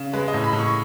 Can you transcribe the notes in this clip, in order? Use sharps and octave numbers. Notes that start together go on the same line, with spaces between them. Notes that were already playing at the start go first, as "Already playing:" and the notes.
Already playing: C#3
G#3 B4
D#5
A2
B5
A2
C#6